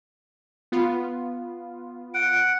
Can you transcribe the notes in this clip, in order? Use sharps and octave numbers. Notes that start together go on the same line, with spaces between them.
B3 F4
F#5 D7